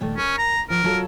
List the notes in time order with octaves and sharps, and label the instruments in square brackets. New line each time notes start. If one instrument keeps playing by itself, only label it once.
[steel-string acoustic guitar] A#2 D#3 A3
[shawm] C#4 [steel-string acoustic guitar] A#4
[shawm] A#5
[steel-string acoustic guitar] F3 [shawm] A#4
[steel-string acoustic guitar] F#3 F4 A4